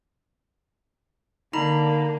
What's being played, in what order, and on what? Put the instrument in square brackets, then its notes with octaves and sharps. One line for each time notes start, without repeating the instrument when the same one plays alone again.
[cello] D3 A#3 [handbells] D#4 A#5 B5